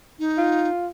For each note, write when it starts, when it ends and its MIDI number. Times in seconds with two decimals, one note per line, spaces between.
0.19 0.69 63
0.38 0.88 65